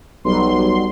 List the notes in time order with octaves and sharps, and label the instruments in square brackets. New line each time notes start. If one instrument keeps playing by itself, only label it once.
[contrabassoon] B1 [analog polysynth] F#3 G3 C6